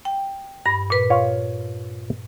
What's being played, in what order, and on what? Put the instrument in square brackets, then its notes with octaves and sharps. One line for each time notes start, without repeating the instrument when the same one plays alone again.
[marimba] G5
G2 B5
A#2 B4
[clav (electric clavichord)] F4 C#5 F5